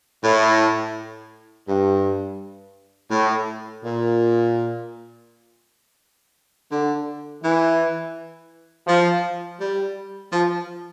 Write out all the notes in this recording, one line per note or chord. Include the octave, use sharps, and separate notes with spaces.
A2
G2
A2
A#2
D3
E3
F3
G3
F3